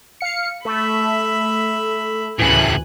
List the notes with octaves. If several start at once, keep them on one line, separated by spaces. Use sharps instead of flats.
F5 C#7
A3 E5 B5
D2 A2 C#3 E3 G#5 F#6